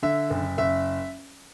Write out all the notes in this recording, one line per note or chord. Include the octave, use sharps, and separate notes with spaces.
D3 E5
F#1
F#1 E5